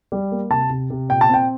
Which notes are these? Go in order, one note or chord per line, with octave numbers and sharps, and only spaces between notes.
G3
A#3
C3 A5
C3
C3
A#2 G5
A5
C4 G5